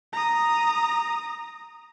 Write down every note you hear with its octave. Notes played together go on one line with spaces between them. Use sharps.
A#5 D#6